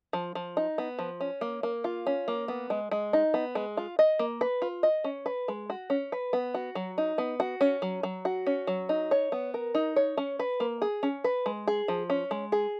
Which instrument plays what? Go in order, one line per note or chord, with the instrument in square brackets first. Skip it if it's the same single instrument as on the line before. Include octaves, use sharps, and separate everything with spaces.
[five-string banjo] F3
F3
D#4
B3
F3
C#4
A#3
A#3
F4
C#4
A#3
B3
G#3
G#3
D#4
B3
G#3
F4
D#5
A#3
B4
F4
D#5
C#4
B4
G#3
F#4
C#4
B4
B3
F#4
F#3
D#4
B3
F#4
C#4
F#3
F#3
F#4
C#4
F#3
D#4
C#5
B3
A#4
D#4
C#5
C#4
B4
A#3
G#4
C#4
B4
G#3
G#4
F3
C#4
G#3
G#4